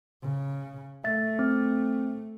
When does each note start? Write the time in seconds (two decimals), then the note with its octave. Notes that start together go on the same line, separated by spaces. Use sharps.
0.22 C#3
1.04 A3 E5 A6
1.39 C4